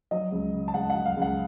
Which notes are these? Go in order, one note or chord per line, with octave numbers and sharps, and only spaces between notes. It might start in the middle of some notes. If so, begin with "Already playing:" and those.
F#3 D#5
C#2
C#3
A5
C#2 F#5
F#5
F#3
F5
C#2
F#5